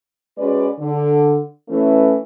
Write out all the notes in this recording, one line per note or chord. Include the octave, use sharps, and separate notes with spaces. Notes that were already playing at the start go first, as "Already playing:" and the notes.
G#3 C#4 F#4 B4 D5
D3
E3 A3 C#4